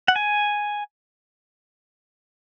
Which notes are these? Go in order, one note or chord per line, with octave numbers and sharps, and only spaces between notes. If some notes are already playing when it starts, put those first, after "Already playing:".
F#5
G#5